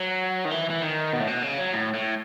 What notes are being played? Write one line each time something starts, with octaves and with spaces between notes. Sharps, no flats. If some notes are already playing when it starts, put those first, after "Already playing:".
Already playing: F#3
D#3
E3
E3
D#3
B2
A2
B2
C#3
F#3
A2
A2